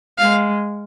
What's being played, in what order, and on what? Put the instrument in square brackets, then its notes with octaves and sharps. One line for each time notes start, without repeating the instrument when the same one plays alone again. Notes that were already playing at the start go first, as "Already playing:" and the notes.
[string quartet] G#3 [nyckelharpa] F5